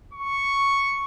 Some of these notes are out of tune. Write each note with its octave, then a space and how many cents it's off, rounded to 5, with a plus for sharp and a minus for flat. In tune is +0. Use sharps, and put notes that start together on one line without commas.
C#6 +0